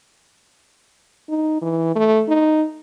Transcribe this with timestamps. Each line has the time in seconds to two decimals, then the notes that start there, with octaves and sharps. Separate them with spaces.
1.29 D#4
1.62 E3
1.96 A3
2.28 D#4